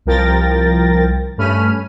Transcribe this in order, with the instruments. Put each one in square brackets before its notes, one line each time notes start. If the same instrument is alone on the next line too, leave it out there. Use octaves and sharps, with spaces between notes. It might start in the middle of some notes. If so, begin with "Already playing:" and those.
[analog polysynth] C2 F3 A#4 G5 A6 A#6
G2 A3 C#4 B5 F6 D#7